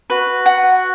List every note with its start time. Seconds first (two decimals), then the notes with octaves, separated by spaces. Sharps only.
0.10 F#4 B4
0.46 F#5